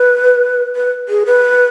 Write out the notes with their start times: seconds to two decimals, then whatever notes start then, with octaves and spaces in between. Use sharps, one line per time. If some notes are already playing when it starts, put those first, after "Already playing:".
Already playing: B4
0.76 B4
1.09 G#4
1.26 B4